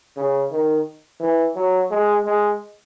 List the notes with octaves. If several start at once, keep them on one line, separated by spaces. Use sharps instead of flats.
C#3
D#3
E3
F#3
G#3
G#3